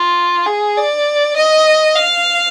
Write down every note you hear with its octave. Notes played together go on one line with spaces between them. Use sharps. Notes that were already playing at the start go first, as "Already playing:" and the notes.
Already playing: F4
G#4
D5
D#5
F5